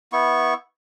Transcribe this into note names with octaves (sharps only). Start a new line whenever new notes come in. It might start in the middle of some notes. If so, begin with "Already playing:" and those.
B3 E4 C#6